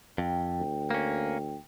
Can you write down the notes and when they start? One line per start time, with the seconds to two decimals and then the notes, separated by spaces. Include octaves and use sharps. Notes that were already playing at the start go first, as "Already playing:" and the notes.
0.18 F2 G5
0.60 D2
0.91 A#3 C#4